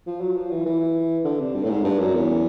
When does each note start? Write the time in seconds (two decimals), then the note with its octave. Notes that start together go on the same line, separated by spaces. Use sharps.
0.07 F3
0.21 F#3
0.36 F3
0.51 E3
0.66 E3
1.25 D3
1.40 C3
1.55 G2
1.63 A2
1.70 G#2
1.84 G2
1.99 F#2
2.14 E2